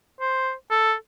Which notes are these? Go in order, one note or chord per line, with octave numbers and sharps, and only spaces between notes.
C5
A4